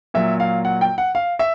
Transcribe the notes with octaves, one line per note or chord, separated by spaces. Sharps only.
A#2 F#3 E5
F5
F#5
G5
F#5
F5
E5